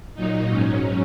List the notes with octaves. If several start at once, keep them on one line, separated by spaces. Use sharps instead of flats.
A#2 F#3 D#4
G#2 F#3 C#4